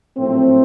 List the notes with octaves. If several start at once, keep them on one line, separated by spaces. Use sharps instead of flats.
A#1 A2 F#3 A3 C4